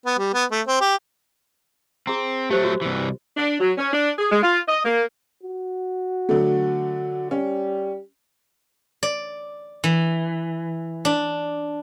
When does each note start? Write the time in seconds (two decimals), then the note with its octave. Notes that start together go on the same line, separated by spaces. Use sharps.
0.06 B3
0.19 G3
0.34 B3
0.51 A3
0.67 C4
0.81 G4
2.07 C4 G#4 A#5
2.51 F#3 A3 G4 C5
2.64 F#4
2.82 C2 E3
3.37 D4
3.60 F#3
3.78 C#4
3.93 D4
4.18 G#4
4.32 G#3
4.43 F4
4.68 D#5
4.84 A#3
5.43 F#4
6.29 D3 F#3 A3
7.31 G3 C#4
9.03 D5
9.84 E3
11.05 D4